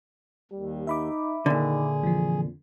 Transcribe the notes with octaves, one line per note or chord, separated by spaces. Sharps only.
D#2 G3
D#4 E5 B5 D6
A#2 D3 D#3 G#4
F2 E3 F3